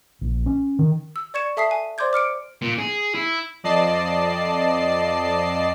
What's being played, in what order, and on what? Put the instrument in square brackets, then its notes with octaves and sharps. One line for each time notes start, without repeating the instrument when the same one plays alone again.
[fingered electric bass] A#1
C#4
D#3
[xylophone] E6
D5 C#6 G#6 C#7 E7
A4 E5 A5 D#6 B6 C7
G#5
C5 D5 C6 D6 G6 G#6
D6 F6 C#7 D7
[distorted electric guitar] A#2
G#4
E4
[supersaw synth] F2 D5 D#5 A5 C7